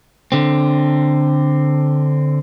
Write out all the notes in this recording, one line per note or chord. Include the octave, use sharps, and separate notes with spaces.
D3 C4